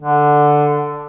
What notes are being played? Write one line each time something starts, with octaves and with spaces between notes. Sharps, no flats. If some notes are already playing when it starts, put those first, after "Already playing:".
D3